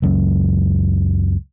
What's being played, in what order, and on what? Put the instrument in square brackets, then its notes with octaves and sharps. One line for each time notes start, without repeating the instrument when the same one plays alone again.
[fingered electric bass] C#2 F#2